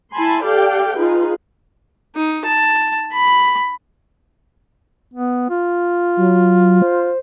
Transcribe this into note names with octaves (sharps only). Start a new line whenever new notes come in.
E4 G#5 A5 B5 C6
G4 A4 D5 F5 G5
D#4 F4 G#4 B4
D#4
A5
B5
B3
F4
F#3
C5